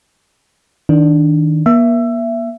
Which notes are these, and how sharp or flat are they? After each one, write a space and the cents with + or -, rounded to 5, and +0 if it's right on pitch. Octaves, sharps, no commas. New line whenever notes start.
D#3 +25 D4 +0
A#3 +40 E5 +20